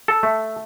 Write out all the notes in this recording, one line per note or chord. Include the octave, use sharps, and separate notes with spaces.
A4
A3